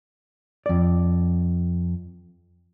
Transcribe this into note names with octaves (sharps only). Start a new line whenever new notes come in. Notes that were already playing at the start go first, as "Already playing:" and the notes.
F2 D5